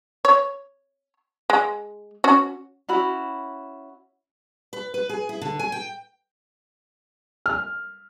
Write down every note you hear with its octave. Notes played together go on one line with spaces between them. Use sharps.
C#5
G#3
C#4 F#4
C#4 E4 F#4 B5
B4
B4
G#4
E4
D3
G#5
G5
F6